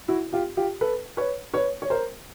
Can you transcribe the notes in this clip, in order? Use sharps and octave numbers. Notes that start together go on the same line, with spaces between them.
E4 F#4
F4 G4
F4 G4
A4 B4
B4 C#5
B4 C#5
C#5
A#4 C5